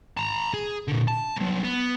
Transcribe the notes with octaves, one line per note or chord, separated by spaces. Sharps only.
A5 A#5
G#4
A#2 D3
A5
C2 F#3
B3